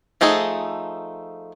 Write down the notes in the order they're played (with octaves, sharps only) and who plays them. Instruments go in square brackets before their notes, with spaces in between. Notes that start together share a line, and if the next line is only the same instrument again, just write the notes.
[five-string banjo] F3 A3 D#4 G#4 A4